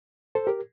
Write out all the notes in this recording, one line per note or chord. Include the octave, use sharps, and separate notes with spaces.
A4 C5
G4 A#4